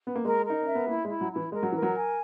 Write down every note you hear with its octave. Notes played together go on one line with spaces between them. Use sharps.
B3
A#3
G#3 A#4
D#4 A#4
C#4 E5
B3
A#3 E4
G#3
E4
F#3
E4
E3
G#3 A#4
F#3
E3 A#4
F#3
G#5